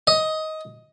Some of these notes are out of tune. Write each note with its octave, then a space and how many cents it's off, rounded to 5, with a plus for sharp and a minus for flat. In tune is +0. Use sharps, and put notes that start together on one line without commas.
D#5 +15